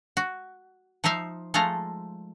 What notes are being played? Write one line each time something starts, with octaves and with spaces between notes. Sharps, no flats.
F#4
F3 D#4 C5 E5 F5
F3 G#3 A3 A4 F5 A#5